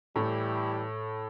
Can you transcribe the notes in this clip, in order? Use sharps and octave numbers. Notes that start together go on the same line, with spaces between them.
A2 E3 G3 E4 G4